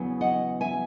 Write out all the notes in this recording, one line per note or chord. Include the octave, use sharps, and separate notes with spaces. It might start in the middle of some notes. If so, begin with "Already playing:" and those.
Already playing: E2 C#3 F#3 B3 E4
D#5 F#5
E5 G#5